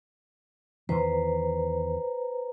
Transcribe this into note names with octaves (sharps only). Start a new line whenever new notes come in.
E2 D#3 E3 B4 C5 A#5